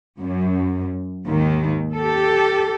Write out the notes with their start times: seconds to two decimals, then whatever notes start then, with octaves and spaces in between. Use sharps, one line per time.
0.20 F#2
1.27 D#2 G#2 D#3
1.94 G4 A4